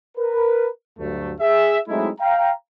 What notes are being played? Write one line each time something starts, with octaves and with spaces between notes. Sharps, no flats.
A#4 B4
D2 G2 F#3 A3
G#4 E5
F#3 G#3 A3 C4 D#4 E4
F5 G5 A#5